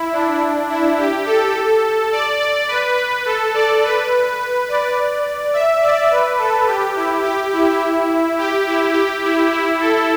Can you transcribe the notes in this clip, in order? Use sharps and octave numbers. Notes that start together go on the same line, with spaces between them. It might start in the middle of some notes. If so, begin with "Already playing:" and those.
Already playing: E4
D4
E4
G4
A4
D5
D5
B4
B4
A4
D5
B4
D5
E5
D5
B4
A4
G4
E4
G4
E4
G4
E4
G4
E4
E4
A4